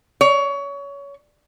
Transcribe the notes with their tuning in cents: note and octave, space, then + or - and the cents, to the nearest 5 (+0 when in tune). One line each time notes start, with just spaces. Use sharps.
C#5 +25